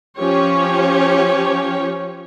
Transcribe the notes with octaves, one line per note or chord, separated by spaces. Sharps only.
F3 C#4 G4 C#5